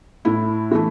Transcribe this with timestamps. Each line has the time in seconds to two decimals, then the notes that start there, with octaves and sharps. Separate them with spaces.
0.25 A2 E4
0.71 E3 A3